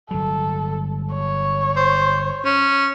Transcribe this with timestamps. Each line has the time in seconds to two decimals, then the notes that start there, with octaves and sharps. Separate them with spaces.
0.11 G1 F#3 A4
1.13 C#5
1.76 C5
2.45 C#4